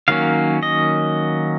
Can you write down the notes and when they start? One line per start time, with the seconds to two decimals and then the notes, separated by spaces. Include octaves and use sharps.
0.08 D#3 F#3 A#3 C#4 F5
0.63 D#5